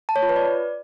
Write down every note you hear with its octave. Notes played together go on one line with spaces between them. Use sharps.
A5
C#5
F4
B4
D5